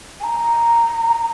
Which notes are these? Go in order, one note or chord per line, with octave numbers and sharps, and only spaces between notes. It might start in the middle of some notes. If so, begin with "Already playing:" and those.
G#5
A#5